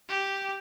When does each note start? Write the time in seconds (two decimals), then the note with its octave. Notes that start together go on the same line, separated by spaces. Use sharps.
0.09 G4